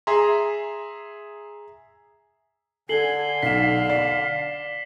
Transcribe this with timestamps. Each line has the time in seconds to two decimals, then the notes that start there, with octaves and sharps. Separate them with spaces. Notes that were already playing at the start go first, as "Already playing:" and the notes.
0.07 G#4 E5 A#5 C6
2.89 D3 A4 G#5 C7 F#7 G7
3.43 B1 F5 B6 E7
3.90 D5